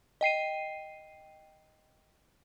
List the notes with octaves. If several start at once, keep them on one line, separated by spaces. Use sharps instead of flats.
D#5 G5 C7 D#7